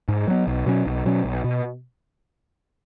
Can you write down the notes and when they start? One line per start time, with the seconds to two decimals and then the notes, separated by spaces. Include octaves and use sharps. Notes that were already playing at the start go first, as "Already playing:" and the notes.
0.08 G#2
0.28 F#3 B3
0.47 B1
0.66 B2 F#3 C#4
0.86 B1
1.05 B2 F#3 C#4
1.24 B1
1.44 B2